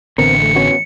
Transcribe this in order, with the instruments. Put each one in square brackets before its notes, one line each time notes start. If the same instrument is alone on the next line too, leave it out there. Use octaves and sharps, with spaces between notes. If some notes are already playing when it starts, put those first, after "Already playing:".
[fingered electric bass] A1 D3 [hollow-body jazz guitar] B3 C4 A#4 [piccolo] C#7
[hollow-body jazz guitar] A3
B3 C#4 F#4